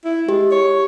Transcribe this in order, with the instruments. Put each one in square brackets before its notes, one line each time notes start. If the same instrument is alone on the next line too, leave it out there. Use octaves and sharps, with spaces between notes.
[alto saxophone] E4
[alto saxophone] G#3 [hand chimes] G4
[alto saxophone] C#5